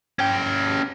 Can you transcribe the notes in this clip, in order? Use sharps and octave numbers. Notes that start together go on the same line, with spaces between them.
C#4 G5